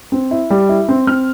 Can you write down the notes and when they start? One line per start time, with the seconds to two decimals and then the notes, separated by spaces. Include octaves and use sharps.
0.12 C4
0.31 E4
0.50 G3
0.69 E4
0.89 C4
1.07 C4 F6